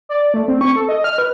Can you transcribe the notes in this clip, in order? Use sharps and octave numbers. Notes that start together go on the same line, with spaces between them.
D5
A3
C4
C#6
A4
D#5
F6
B4